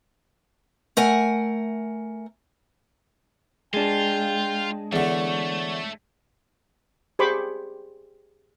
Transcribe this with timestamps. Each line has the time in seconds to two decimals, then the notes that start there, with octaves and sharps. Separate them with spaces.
0.97 A3 A#4 F#5 G#5
3.74 G#3 D4 F4 G5
4.93 E2 D3 A3 C#5
7.19 G4 G#4 C5 B5 C#6 D6